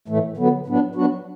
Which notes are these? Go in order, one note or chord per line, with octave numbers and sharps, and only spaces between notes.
A2 E3 A3
D3 F#3 B3
A2 F#3 B3 D4
F#3 B3 D4 F#4